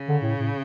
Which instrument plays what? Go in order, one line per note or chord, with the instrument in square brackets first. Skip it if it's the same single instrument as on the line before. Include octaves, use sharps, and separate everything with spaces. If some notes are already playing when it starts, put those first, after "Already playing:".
Already playing: [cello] C#3
[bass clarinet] D3
A2
A2